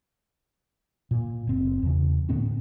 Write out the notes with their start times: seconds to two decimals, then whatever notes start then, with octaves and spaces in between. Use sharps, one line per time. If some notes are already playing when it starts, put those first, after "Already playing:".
1.11 A#2
1.47 F#1 C4
1.83 E2 C#3
2.29 D2 A2 B3 C#4